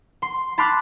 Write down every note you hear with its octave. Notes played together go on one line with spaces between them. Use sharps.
C6
A5 B5 C6 D6 F6 F#6